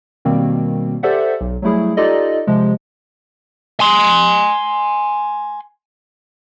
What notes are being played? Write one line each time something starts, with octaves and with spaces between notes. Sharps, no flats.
B2 D#3 G3 A#3 C4
G4 A4 C5 D5 E5 F#5
B1
F#3 G3 A3 E4 G#4
D#4 F4 G4 A4 D5 D#5
C3 F3 G#3
G#5 C6